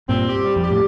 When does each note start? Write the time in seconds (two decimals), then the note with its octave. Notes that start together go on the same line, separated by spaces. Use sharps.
0.09 G2 A#2 C4
0.28 G4
0.44 G3
0.56 F2
0.63 G4
0.70 A2